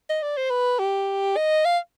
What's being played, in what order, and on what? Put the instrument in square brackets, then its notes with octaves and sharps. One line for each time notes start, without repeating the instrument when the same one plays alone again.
[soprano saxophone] D#5
D5
C5
B4
G4
D#5
F5